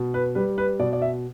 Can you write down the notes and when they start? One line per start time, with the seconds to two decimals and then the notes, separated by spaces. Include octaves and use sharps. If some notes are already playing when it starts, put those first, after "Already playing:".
Already playing: B2
0.14 B4
0.35 G3 B4
0.58 B4
0.79 B2 D5
0.93 D5
1.02 E5